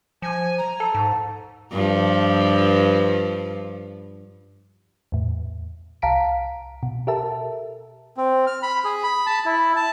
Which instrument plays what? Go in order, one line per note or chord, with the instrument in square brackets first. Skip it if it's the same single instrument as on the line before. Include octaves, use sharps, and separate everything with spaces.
[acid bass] F3 [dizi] G#5
[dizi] A#5
[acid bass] A4 [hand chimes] A5
[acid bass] G#2
[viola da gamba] G2 F3
[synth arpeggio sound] E2 A2
C2 F5 A5 A#5 B6 D7
B2
G4 A4 A#4 E5 A5
[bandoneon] C4
F6
B5
G#4
B5
A5
E4
A5